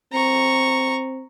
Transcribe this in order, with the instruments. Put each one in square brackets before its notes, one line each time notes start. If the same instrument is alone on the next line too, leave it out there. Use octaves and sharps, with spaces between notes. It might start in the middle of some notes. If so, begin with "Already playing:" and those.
[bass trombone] C4 [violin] A#5 C#6